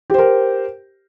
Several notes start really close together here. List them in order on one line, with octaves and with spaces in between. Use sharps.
G4 C5 A#4